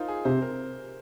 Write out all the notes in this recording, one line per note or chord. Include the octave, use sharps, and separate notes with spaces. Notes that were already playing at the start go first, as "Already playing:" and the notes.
Already playing: D#4 F4 A#4 C5
G#4
C3 C5
A#4